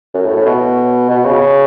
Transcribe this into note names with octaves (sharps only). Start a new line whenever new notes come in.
F#2
A2
A2
B2
B2
C#3